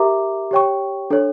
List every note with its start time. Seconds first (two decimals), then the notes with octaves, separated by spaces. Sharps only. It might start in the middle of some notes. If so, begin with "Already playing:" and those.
Already playing: G4 A#4 E5 A#5 D6
0.51 G4 C#5 G5 C#6
1.10 D4 A4 C#5